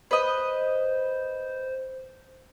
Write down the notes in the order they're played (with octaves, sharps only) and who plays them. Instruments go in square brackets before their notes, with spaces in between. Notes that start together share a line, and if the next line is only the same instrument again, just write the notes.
[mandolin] B4 D#5 [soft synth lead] C5